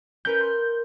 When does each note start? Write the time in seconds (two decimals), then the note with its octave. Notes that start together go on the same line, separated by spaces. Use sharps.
0.25 C#4 A#4 B4 G6
0.41 C6